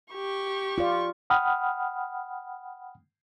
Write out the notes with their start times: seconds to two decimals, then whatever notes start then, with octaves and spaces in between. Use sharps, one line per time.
0.13 G4 C#6
0.78 F4 D5
1.30 F#5 G5 B5 D#6 F6